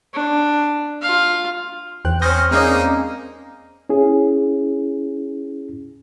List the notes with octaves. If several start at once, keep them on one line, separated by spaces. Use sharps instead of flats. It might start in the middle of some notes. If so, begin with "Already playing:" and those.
D4
F4 F5
E2 C5 G5 F#6
C4 C#4 D#6 F6 G6 A#6
G#3 A#3 C4 C#4 D#4 D5
C#4 E4 G#4